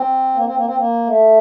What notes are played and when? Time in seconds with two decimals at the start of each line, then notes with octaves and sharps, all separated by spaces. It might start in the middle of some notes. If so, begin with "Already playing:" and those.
Already playing: C4
0.35 A#3
0.45 C4
0.55 A#3
0.66 C4
0.76 A#3
1.07 A3